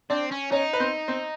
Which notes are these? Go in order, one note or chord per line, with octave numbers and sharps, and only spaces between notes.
C4 D4 D5
C#4
C#4 D#4 C#5
B4
C4 C5
C4 C5